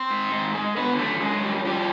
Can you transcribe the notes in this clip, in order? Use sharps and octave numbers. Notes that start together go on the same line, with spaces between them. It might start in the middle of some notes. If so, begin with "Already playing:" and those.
Already playing: C4 C5
G#2
G#2
G#3
D3 B3 B4
F#2 A3 A4
F#2 G#3 G#4
G3
F3 G3 G4